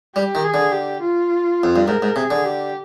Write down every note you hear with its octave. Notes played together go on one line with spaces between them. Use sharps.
G3 G4
D#3
G#4
D3
G4
F4
F2
G2
G#2 A#4
G#2
C3 G#4
D3
G4